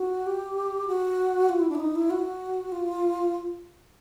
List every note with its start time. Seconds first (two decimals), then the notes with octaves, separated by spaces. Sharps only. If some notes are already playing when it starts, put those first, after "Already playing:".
Already playing: F#4
0.26 G4
0.88 F#4
1.49 F4
1.59 E4
1.69 D4
1.75 E4
1.80 D#4
1.95 E4
2.10 F#4
2.72 F4